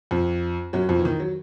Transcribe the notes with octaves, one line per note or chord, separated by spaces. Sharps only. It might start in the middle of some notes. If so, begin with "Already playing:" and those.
F2 F3
F#2 F#3
F2 F3
E3
D#3
F#3